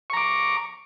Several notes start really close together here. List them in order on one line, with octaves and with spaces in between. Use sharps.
C#6 A#5 D6